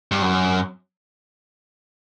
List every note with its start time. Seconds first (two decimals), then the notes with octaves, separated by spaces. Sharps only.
0.12 G2
0.22 F#2